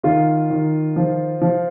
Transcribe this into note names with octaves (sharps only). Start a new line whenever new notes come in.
D#3 F4
D#3
F3
F3